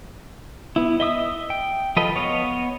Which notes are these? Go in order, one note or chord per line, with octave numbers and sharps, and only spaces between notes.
B3 E4
D#5 E5 D#6 E6
G5
F3 F4 A4 B4 D#5
B3 C#5 D#5 F5